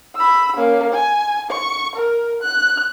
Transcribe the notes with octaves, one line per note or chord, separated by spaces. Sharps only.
B5 E6
A#3 C#4
G#5
C#6
A#4
F#6